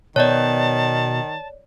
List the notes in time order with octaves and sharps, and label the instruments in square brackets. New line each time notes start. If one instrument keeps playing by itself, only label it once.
[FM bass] B2 [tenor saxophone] D#3 [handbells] C#5 D5 [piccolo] A5